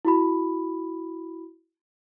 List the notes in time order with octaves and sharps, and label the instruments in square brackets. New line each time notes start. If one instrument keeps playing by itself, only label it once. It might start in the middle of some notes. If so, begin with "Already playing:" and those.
[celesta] E4 F#4 B5